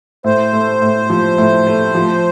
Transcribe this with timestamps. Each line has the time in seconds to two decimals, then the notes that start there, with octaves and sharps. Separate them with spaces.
0.24 A2 C5
0.53 A3
0.82 A2
1.10 F3
1.38 A2
1.67 A3
1.95 F3